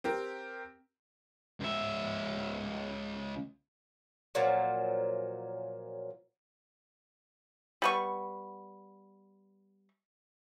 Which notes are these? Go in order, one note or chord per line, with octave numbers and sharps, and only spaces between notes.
C4 G4 A#4
C#2 E5
A#2 F3 F#3
G3 B3 C#6